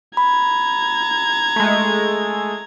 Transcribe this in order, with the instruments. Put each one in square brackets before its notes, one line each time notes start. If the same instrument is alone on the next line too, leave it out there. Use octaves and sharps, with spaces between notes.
[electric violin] A#5 G#6 [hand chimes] B5
[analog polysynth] G#3 A3